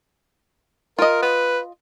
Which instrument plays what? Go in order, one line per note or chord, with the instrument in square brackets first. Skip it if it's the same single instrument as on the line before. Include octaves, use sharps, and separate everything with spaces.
[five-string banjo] F4 D#5 [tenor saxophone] A#4
[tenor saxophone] B4